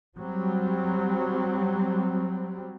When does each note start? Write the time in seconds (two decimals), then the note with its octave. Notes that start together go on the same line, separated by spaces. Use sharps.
0.18 F#3 G3 C4